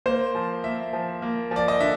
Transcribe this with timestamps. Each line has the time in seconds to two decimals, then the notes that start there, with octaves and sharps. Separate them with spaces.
0.06 A#3 C5
0.35 F3
0.64 A#3 E5
0.93 F3
1.22 A#3
1.51 F3
1.56 D5
1.68 D#5
1.80 D3 E5